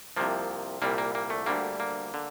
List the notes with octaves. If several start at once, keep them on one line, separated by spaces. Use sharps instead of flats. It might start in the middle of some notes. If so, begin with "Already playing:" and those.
C2 C3 F3 A#3
C2 A#2 G3 A#3
A#3
A#3
A3
D2 D3 G3 A#3
A#3
D3